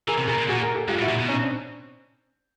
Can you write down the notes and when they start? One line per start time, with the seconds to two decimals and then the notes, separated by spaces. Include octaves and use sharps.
0.08 E3 G#4 A#4
0.18 C3
0.28 B2 G#4 A#4
0.38 A#2
0.48 A#2 F#4 G#4
0.62 G#4 A#4
0.75 G4 A4
0.88 G#2 F4 G4
0.99 A2
1.02 E4 F#4
1.09 A#2
1.19 B2
1.28 C#4 D#4
1.42 C4 D4